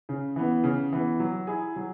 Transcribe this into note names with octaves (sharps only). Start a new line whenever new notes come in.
C#3
E3 B3
C#3
E3 B3
F#3
E4 G#4
F#3